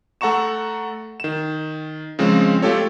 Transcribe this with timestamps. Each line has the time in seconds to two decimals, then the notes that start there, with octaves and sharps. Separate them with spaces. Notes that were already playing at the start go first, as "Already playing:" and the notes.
0.21 A3 A4 F#5 A#5 C#6 E7
1.20 D#3 E7
2.19 C#3 F3 G#3 C4
2.62 A3 F4 G4 A4 C#5